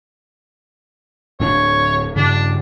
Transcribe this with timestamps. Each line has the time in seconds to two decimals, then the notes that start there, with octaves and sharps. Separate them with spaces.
1.40 D1 A2 D4 C#5
2.16 G2 C#3 D4